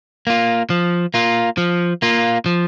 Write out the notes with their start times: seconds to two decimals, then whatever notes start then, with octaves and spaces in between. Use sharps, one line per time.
0.27 A#3 F4
0.70 F3
1.14 A#3 F4
1.58 F3
2.02 A#3 F4
2.46 F3